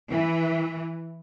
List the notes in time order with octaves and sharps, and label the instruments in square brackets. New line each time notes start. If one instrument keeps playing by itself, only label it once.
[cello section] E3